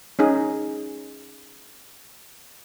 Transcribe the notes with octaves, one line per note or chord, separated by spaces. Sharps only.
C#4 D#4 G#4